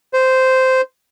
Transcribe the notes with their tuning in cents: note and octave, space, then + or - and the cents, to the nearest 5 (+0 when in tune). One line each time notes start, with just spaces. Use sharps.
C5 -10